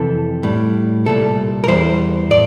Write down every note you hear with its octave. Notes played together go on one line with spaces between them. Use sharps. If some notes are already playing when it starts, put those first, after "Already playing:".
Already playing: F2 C3 E3 A4
A2 G3
C2 A#2 G3 A4
A#4
E2 E3 G3 C5
A2 D5